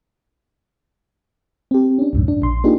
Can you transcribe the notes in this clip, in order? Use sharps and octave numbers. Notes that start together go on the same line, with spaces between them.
C4 G4
C#4 D4
B1 F2 G#2
D4
A#1 C6
A#3 D4 D#4 F4 G4 G#4